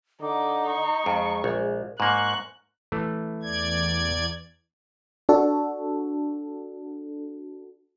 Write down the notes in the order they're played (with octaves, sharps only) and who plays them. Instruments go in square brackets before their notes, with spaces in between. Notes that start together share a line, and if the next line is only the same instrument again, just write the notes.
[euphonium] D3 [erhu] D#4 [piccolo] D6
[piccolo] C#6
[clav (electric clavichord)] F2 [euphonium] G#3
[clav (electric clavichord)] A#1
[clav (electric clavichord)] G#2 A#3 [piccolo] C#6 [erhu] F#6
[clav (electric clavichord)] E3 A3
[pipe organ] E2 D5 G#6
[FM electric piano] D4 F#4 A4